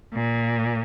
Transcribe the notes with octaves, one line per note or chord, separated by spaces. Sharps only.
A#2